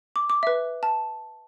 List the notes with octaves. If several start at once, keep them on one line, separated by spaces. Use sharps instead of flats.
D6
D6
B4 E5
A5